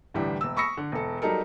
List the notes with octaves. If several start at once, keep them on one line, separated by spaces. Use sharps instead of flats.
C2 A2 D3 E3 G3
E1 E6
B5 C#6 D#6 E6 A#6 C#7
D3
E1 A4
F#3 G3 D#4 A4 A#4